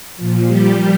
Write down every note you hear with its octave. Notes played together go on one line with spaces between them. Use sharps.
A#2 F3
G3 G4